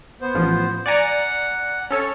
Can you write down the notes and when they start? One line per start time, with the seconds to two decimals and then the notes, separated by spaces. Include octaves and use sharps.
0.21 B3 C5
0.35 A1 F3
0.86 D5 F#5 G#5 A#5
1.91 C#4 A4 C#5